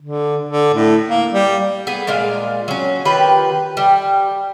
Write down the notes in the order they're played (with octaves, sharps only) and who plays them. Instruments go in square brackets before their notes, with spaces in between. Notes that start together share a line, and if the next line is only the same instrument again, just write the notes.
[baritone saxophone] D3
D3
A2
A#3
G3
[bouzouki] B3 G#4
A#2 G#3 D5 F5
F#3 C#4
D#3 F4 G4 B4
G3